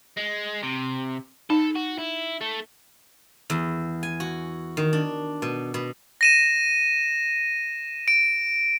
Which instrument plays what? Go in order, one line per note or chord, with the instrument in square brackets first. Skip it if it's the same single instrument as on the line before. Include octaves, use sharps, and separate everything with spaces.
[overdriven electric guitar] G#3
C3
[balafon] D#4 [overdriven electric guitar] A4
[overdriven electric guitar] F#4
E4
A3 A4
[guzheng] E2
G#5
F#4
D#3
D4
B2
B2
[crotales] A#6 D#7 E7
D7